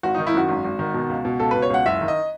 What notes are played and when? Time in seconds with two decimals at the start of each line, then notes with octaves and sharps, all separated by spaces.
0.03 G#1 F#4
0.15 D#3 D#4
0.27 E4
0.34 F#2 F#4
0.49 G#1
0.65 G#1
0.79 D#3
0.94 B2
1.09 C#2
1.25 B2
1.40 C#2 A4
1.51 B2 B4
1.62 C#5
1.70 C#2 F#5
1.86 F#1 E5
2.01 D#3
2.08 D#5